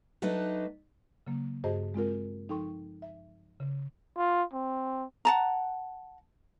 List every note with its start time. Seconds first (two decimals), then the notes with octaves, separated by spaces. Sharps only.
0.22 F#3 A3 D4 D#4 B4 D#5
1.27 C#3 F#3 A#3
1.64 G2 F#4 G#4 C5 D#5 A5
1.94 G#3 C4 F4 A#4
2.49 F3 D#4 A4 G5 C6 C#6
3.02 E5
3.60 C#3
4.17 F4
4.54 C4
5.25 F#5 A5 A#5